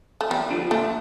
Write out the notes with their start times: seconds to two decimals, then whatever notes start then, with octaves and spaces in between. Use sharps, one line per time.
0.21 A3
0.30 E2 G3
0.51 D3 F3
0.71 A#2 A3